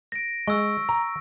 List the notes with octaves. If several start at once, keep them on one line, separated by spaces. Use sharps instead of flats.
A#6 D7
G#3 C#6 E6
A#5